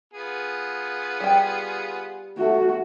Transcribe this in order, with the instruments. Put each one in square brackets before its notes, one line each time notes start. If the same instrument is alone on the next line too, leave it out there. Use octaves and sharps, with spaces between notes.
[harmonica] B3 F4 G#4
[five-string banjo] G3 G5
[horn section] A3 [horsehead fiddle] F#4